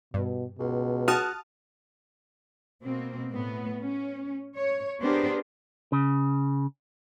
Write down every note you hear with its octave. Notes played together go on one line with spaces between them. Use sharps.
G2 B2
C#2 B2
F#4 A5 D#6 F6
B2 A#3 C4
A2 B3
C#4
C#5
B3 D4 G4 G#4 A#4 C5
C#3